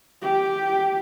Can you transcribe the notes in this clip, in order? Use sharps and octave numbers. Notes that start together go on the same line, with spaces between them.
G4